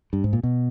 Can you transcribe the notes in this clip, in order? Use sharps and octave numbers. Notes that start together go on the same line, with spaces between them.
G2
G#2
A#2
B2